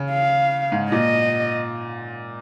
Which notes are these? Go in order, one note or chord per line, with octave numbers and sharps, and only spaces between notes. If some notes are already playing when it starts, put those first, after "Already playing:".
Already playing: C#3
F5
G#2
A#2 D#5